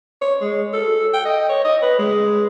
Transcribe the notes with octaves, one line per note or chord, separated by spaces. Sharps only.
C#5
G#3
A4
G5
D#5
C#5
D#5
B4
G#3